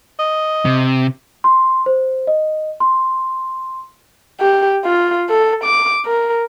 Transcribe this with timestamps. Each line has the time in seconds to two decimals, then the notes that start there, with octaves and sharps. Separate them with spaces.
0.19 D#5
0.65 C3
1.44 C6
1.86 C5
2.27 D#5
2.80 C6
4.40 G4
4.84 F4
5.29 A4
5.64 D6
6.06 A#4